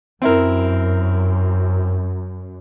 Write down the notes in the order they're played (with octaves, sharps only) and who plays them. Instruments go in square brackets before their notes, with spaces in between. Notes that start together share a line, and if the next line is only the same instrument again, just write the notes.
[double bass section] F#2 [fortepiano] C4 E4 A#4